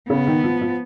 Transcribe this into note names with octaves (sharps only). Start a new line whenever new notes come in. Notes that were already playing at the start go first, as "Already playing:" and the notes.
C#3 B3
D#3
F3
F3